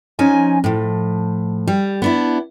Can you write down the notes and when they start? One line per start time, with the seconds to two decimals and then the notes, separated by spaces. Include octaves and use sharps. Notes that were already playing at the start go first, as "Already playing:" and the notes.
0.19 F3 C#4 D#4 G#5
0.64 A2 F3
1.68 G3
2.02 B3 D4 E4